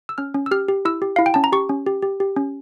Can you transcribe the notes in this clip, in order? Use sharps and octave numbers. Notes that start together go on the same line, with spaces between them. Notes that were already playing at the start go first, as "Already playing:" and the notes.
E6
C#4 F6
C#4
E6
G4 F6
G4
E4 E6
G4
E4 F5
G5
C#4 A5
A#5
G4 C#6
C#4
G4
G4
G4
C#4